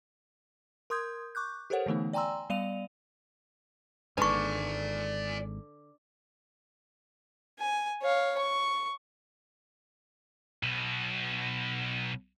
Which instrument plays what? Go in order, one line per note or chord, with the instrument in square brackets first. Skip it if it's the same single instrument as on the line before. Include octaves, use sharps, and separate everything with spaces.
[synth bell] A#4 C6 D#6 G6 G#6
C#6 D6 F#6 G6
G4 A4 A#4 C5 C#5 F#5
D3 E3 A3 B3 D#4
D5 G5 G#5 A#5 C6 E6
G3 B3 D5 F5 D#7 F7
[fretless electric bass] G#1 G#2 [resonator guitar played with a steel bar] D3 [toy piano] B4 C#6 [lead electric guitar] D5 G#5
[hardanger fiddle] G#5
C#5 F5
C#6
[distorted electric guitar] B1 B2